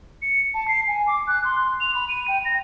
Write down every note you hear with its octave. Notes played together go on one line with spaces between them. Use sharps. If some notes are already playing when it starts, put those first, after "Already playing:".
C#7
A5
C7
G#5
D6
F#6
C6
F7
B5
D#7
G5
A#6